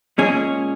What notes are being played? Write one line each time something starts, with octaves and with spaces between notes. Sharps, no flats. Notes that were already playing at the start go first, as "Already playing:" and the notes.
A#2 G#3 C#4 G#4